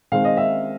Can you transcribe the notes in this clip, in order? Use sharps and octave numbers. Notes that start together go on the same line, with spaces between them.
D#3 G#3 C4 F5
D#5
E5